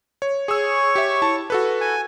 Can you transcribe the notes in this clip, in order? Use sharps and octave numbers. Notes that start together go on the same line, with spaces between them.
C#5
G#4 C#5 C#6 E6
G4 E5
E4 A5
F#4 A4 B4
G#5